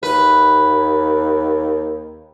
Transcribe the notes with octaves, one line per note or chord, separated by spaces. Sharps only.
D#2 B4